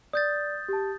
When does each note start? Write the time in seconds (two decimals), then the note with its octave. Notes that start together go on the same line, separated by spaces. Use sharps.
0.13 D5 D#6 G6 A6
0.68 G4 A5